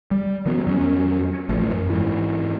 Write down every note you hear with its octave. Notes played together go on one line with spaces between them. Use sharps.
G3
D#3 E3 F#3 B3
F2 F#3 C#4
A1 A2 F3
F#2
G#2 E3